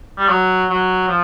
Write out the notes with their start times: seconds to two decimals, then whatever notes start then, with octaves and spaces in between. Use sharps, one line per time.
0.18 G3
0.29 F#3
0.69 F#3
1.08 F3